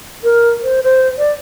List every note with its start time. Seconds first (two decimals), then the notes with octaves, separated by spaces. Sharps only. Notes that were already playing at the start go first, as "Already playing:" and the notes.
0.24 A#4
0.63 C5
0.83 C5
1.18 D5